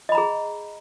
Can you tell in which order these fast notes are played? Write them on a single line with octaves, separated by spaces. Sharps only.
D#5 B5 A#5 G#4